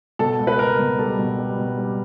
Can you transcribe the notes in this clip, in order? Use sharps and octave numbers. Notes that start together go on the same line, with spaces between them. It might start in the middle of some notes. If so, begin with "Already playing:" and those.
B2 A4
C#2
B4
C#2 A#4
B2
G3 A4
B2
G3
B2
G3